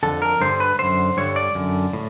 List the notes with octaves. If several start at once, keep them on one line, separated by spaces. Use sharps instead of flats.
F2 D3 A4
A#4
G2 D3 C5
B4
F#2 D3 C5
G2 D3 C#5
D5
F#2 D3
A2